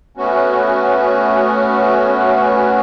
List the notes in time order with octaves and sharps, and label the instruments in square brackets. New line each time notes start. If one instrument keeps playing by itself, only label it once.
[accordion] A3 B3 C#4 F#4